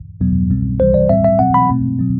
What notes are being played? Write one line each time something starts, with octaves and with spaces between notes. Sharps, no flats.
E2 B2 F#3 B3
C2 B2 G3 C4
C2 C3 E3 G3 C5
D5
A2 G3 C4 E5
E5
B2 F#3 C4 F#5
B5
B2 A3 C4
B2 F#3 C4